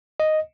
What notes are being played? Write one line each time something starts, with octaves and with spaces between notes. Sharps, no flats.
D#5